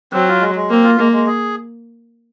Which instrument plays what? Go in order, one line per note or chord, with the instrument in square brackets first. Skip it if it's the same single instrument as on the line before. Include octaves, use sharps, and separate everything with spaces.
[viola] F#3 [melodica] C4
[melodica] F4
G#3
G#3
[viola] A#3 [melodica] C4
[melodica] F4
[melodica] G#3 [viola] A#3
[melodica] G#3
G#4